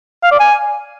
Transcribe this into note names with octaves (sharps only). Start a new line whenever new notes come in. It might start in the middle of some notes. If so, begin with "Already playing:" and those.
F5
D5
G#5